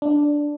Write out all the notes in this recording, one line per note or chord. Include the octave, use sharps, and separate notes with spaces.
D4